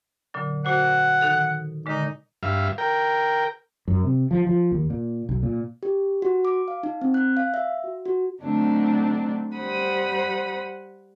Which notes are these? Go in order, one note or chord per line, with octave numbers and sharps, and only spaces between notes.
A#2 D3 F#3
A#2 F#4 C5 F#5
D#3 D#4 A4
A#2 D3 G#3 D#4
G2 E5 F5
A#4 G5
F#2
C3
F3
F3
D#2
A#2
B1
A#2
G4
F#4
D6
F5
D#4
C4
F#6
F5
E5
F#4
F#4
D3 F#3 A3 C4 D4 D#4
G3 C5 F#5 B5 D#6